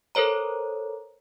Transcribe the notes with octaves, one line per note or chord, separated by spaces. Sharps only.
A4 A#4 C5 C#5 A#5